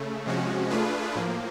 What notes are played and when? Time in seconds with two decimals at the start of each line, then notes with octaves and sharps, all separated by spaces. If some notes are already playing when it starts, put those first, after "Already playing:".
Already playing: C#3 A3
0.26 C3 F3 G#3 C#4 F#4
0.70 A3 D4 F4 G#4 B4
1.15 A2 F3 A#3